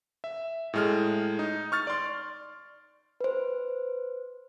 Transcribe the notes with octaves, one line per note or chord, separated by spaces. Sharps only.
E5
A2 G#3 F6
D#4
C#6 F6 A6
D5 C6
B4 C5